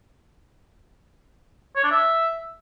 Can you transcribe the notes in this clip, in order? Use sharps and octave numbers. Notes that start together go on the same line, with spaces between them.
C#5
D4
E5